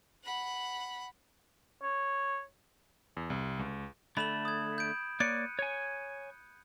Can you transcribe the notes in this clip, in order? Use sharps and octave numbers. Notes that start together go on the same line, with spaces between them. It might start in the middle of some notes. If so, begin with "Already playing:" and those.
F#5 B5
C#5
E2
C2
C#2
D3 A3 B5 E7 F#7
D#6 G#6
G6 D7
A#3 C#5 D5 F#6 C#7 D#7
C#5 G#5